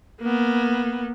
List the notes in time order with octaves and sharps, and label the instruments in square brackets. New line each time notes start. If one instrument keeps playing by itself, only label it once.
[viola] A#3 B3